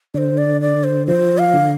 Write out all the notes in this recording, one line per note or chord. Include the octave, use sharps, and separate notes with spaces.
D3 C5 D5
D5
D5
C5
F3 C5
F5
D3